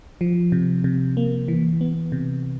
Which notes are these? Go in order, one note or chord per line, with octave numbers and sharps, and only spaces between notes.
F3
C3
C3
A#3
E3
B3
C3